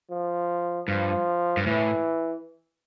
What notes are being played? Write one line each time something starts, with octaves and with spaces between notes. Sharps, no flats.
F3
G2 F3
G2
A2 E3